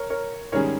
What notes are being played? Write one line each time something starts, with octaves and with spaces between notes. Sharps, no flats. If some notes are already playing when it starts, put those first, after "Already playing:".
Already playing: A#4 C#5
A#4 C#5
G#2 D#3 G3 C#4 G#4 A#4 C#5